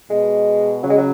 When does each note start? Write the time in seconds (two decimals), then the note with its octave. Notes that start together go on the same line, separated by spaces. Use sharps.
0.10 B2 G#3
0.83 C#3 F#3
0.90 G#3
0.98 F#3